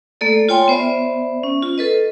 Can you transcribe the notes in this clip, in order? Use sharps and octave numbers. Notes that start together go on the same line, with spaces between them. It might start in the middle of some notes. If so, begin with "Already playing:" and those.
A3 A#3 A4 D5
F4 C#5 G5 G#5 C6
B3 C5 D5 E5
C#4
F4
A4 B4 D#5